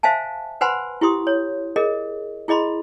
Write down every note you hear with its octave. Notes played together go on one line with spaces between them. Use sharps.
C5 E5 F5 G#5 A5
B4 C5 F#5 G#5 B5 C6
E4 G4 C6 D#6
C#5
G#4 A#4 D#5
E4 G#4 D#5 B5 C6